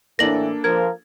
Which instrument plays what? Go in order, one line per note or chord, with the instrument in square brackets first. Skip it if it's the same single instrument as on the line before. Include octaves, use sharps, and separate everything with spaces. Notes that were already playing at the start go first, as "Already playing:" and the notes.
[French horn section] A2 E3 [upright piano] A#3 D4 A4 [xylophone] A#6 F#7
[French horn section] F3 [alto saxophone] A#4 [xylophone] G#6